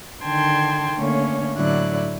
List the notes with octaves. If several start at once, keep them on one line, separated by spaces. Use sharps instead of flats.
D3 D#3 G5 A5 C6 G#6
D3 A3 A#3 C#4 C#5
A2 D3 F#3 E4 D5 F#6